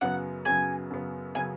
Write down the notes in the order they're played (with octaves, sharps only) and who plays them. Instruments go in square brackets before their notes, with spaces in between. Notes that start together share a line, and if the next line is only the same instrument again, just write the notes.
[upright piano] F#2 C#3 F#3 B3 [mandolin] F#5
[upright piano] F#2 C#3 F#3 B3 [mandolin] G#5
[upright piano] F#2 C#3 F#3 B3
[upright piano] C#3 F#3 B3 [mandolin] G#5